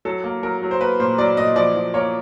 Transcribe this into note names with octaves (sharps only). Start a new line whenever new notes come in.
F#3 A4
A#3
F#3 A#4
F#3
C5
A#3 B4
A#2 C5
F#3 D5
A#2 D#5
F3 D5
F3
A#3 C#5